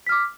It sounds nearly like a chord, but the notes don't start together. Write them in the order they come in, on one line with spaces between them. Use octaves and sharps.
B6 F6 D6